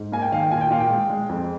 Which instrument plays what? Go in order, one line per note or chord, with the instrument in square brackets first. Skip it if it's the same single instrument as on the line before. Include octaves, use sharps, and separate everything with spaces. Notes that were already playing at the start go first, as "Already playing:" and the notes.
Already playing: [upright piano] G#2
A#3 G#5
G5
D#3 F5
G5
A#2 G#5
G5
A#2 F5
G5
G#3
G#3
F2